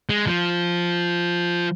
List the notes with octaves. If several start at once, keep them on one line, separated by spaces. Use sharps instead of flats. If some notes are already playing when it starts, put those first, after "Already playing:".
G#3
F3